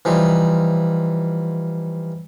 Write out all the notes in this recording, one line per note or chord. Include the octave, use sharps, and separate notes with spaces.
E3 F3 G3 D#4